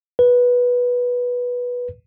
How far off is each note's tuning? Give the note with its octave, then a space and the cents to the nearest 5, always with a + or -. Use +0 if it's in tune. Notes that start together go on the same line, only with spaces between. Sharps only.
B4 -10